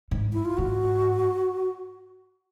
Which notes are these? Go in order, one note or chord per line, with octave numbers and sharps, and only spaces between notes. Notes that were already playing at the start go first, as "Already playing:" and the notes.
G#2
E4
F4
G#2 F#4